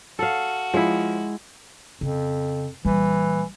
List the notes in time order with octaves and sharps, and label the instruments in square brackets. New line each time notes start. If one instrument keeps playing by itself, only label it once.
[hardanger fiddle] F#4 [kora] A4 F5
[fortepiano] F3 [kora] G#3 E4
[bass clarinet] F2 [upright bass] C#3
[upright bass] A#1 G3 [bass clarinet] E3